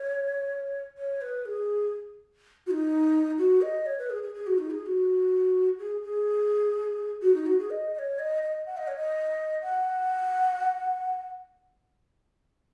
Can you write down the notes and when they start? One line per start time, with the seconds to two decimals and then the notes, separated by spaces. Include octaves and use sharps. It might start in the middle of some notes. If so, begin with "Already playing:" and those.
Already playing: C#5
0.98 C#5
1.21 B4
1.45 G#4
2.66 F#4
2.71 D#4
3.38 F#4
3.62 D#5
3.86 C#5
3.99 B4
4.10 G#4
4.23 G#4
4.35 G#4
4.47 F#4
4.58 D#4
4.70 G#4
4.82 G#4
4.86 F#4
5.79 G#4
6.02 G#4
7.22 F#4
7.34 D#4
7.46 F#4
7.59 G#4
7.70 D#5
7.94 D#5
7.99 C#5
8.19 D#5
8.42 D#5
8.66 F#5
8.77 D#5
8.87 C#5
8.97 D#5
9.62 F#5